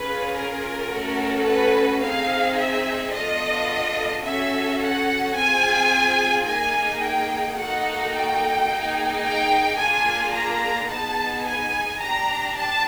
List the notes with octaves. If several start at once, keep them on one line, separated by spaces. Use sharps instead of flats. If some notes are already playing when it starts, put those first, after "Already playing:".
Already playing: C#4 F4 G#4 B4
A#4
A3 C#4 F#4 A4
B4
C4 D#4 G#4 F5
E5
B3 D4 F4 A4 D#5
C#4 F#4 A4 E5
F#5
C4 F4 G#4 G#5
A#3 D#4 G#4 G#5
G5
A#3 D#4 F#4 A4 F#5
G5
A#3 D#4 G#4
G5
A#3 D4 F4 G#4 G#5
A#5
B3 D#4 G#4 A5
G#5
D4 G4 A#5
A5